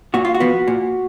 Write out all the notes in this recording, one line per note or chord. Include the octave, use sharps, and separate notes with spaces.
A#2 F#4
F4
F#4
F3 B3
A#2